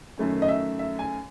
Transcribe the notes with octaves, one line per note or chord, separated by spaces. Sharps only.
F#2 D#3 A3 C#4
D#5
E5
E5
G#5